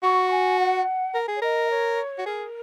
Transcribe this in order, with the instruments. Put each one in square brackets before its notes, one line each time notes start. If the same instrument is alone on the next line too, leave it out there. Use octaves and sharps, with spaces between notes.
[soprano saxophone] F#4 [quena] C#6
[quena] G#5
F#5
[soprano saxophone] A#4
G#4
[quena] C#5
[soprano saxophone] A#4 [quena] D#5
[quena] C#5
[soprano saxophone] F#4
[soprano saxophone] G#4 [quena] A#4